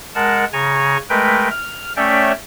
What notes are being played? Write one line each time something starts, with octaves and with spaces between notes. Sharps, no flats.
G#3 A#4 F#5 A5
C#3 G#5 A#5 C#6
G#3 A3 A#4 B4 G5
F6
A3 C#4 C#5 D5 E5 G5